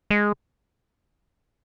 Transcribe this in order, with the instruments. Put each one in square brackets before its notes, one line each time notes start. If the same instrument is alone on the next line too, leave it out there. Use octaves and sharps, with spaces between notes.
[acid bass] G#3